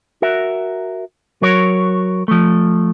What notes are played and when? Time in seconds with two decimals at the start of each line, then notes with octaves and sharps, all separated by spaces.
0.22 F#4 A#4 E5
1.42 F#3 F#4 A#4 C#5
2.28 F3 A3